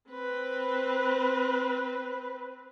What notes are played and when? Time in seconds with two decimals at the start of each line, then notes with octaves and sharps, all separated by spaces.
0.10 C4 B4